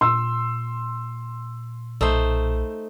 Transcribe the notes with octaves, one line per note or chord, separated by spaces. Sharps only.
A#2 C6 E6
B1 A3 D#4 C5